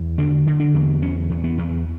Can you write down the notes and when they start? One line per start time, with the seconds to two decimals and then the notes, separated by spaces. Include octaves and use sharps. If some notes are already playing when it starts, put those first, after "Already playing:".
Already playing: E2
0.18 D3 D4
0.46 D3
0.60 D4
0.74 E2
1.02 E2 C#4
1.30 E2
1.44 B3
1.58 E2